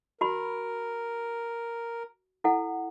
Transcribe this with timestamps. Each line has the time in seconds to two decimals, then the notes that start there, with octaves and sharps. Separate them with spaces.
0.21 F#4 A#4 B5
2.44 E4 A4 F#5